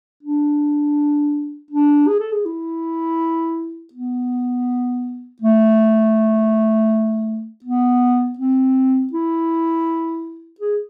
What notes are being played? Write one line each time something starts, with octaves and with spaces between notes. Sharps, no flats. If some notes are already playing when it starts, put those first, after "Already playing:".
D4
D4
G#4
A4
G#4
E4
B3
A3
B3
C4
E4
G#4